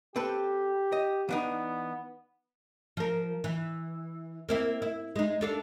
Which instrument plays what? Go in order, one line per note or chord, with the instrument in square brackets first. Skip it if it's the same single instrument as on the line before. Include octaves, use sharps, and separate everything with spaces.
[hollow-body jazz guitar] C4 A4 B4 [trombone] G4
[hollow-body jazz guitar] D#5
[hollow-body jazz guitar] E3 D4 D#4 [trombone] B3
[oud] F3 A#4
E3
A#3 C4 E4
E4
G#3 D#4
D4 A4 F5